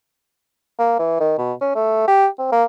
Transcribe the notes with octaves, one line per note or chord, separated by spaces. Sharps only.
A#3
E3
D#3
B2
C#4
A3
G4
C4
A#3